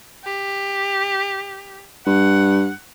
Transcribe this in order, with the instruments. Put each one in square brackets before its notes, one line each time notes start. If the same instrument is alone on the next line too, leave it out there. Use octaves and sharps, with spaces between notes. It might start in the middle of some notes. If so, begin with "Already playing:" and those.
[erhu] G4
[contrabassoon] G2 [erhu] F#5